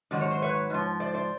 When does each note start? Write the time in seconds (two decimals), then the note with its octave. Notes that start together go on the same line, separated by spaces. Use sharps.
0.11 G#2 D#3 F#3 D5
0.21 C#5
0.31 C5
0.42 B4 C#5
0.70 G#2 F3
1.00 C5 D5
1.14 C5 D5